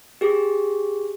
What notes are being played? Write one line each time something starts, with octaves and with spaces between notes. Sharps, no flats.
G4 G#4